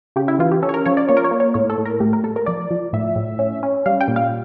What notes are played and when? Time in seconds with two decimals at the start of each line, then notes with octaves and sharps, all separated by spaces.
0.16 C#3 G4
0.28 E4
0.39 E3 F4
0.51 G4
0.63 C#4 A4
0.69 C#5
0.74 A#4
0.86 F3 C#5
0.97 D5
1.09 A#3 C#5
1.17 A#4
1.24 C#5
1.31 A#3
1.40 C#5
1.54 A2 C#5
1.70 A4
1.78 A2
1.86 A#4
2.00 A3 G4
2.13 A#4
2.24 A3 A4
2.36 A#4
2.46 F3 D5
2.71 F3
2.93 A2 E5
3.16 A2
3.39 C#4
3.63 C#4
3.86 G3 F5
4.01 G5
4.08 A#2
4.16 F5